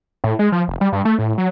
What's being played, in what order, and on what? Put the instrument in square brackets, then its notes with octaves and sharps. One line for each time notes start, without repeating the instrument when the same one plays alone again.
[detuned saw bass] A2
G#3
F3
F1
G3
G2
A3
A2
F#3